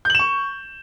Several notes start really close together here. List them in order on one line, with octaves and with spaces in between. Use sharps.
G6 F#7 E7 C#6